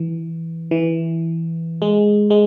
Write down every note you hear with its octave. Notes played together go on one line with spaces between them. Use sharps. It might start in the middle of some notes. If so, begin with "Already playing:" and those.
Already playing: E3
E3
G#3
G#3